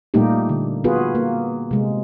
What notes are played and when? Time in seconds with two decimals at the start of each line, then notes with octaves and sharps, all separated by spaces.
0.14 A#2 G3 A3 A#3 D#4 G4
0.49 D3
0.84 B3 F4 F#4 G#4 B4
1.15 A#3
1.71 C3 G#3